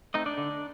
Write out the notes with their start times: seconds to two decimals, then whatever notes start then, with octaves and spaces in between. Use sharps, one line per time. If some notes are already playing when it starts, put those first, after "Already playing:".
0.14 A3 C4 D#4 D#5
0.26 D4 D5
0.38 D3